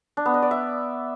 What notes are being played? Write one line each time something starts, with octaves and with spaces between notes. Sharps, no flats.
D4
B3
D#5
D5
E5